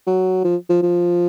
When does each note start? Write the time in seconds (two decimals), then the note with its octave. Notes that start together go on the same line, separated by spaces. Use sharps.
0.07 F#3
0.45 F3
0.70 F3
0.82 F3